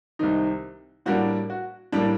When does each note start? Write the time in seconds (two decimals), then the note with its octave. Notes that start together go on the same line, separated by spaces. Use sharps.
0.19 C2 C3 D#3 D#4
1.06 A2 G3 A#3 D4 F#4
1.50 F#4
1.92 A2 G3 A#3 D4